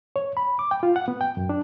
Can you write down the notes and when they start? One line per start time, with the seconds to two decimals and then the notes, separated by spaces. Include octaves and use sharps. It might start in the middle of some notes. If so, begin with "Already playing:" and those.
0.16 C#5
0.37 B5
0.59 D6
0.71 G5
0.83 F4
0.96 F#5
1.08 B3
1.21 G5
1.37 F#2
1.49 D4